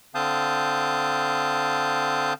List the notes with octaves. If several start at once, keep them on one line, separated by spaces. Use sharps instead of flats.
D3 C4 F5 A5 D#6 G6